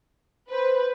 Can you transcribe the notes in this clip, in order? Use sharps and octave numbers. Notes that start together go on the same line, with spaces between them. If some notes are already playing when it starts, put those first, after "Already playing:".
B4 C5